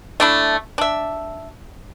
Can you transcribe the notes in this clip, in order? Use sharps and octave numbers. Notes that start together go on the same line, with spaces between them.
A3 D4 E4
D4 E5